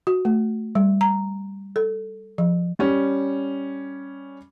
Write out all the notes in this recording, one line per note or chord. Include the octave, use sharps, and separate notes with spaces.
F#4
A3
G3
A#5
A4
F3
G3 C#4